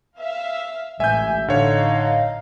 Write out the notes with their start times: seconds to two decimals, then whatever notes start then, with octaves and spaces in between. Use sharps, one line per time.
0.19 E5 F5
1.00 A1 G#3 A3 C#4 E5 G#5 G6
1.48 A2 D3 D#4 C#5 F5